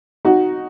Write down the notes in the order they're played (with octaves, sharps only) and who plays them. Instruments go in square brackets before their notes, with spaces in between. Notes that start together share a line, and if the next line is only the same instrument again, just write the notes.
[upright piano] D#4 F#4